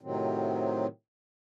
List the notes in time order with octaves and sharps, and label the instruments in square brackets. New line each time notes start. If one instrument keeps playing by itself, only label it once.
[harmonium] A2 C3 D#3 F#3 C4